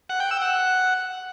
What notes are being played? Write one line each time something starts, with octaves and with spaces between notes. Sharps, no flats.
F#5
G5
E6
F#5